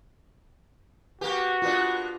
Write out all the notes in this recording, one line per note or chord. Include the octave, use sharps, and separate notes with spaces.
A#3 F#4 G4 B4
A#3 B3 D4 F4 G4